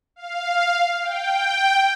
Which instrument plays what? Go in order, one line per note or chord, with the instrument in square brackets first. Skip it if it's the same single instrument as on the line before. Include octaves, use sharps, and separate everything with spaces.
[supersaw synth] F5
G5